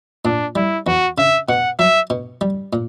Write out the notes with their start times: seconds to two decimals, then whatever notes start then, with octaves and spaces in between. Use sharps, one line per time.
0.25 A#2 D4
0.55 G3 E4
0.87 E2 F#4
1.18 C#3 E5
1.49 B2 F#5
1.79 F#3 E5
2.10 B2
2.41 G3
2.73 A#2